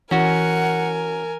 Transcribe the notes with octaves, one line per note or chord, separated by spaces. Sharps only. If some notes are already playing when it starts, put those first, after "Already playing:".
E3 C#4 F#4 A#4 F#5 G#5